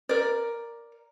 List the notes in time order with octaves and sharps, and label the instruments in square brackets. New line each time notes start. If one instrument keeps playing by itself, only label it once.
[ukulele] A#4 D5